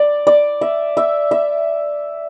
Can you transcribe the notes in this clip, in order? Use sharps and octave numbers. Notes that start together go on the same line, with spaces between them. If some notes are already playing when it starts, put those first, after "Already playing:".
Already playing: D5
D5
E5
E5
E5